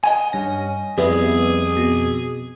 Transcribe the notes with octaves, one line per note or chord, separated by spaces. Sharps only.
D#5 F#5 G#5
G2 C#4 A#6
F2 G3 B3 E4 G#4
B2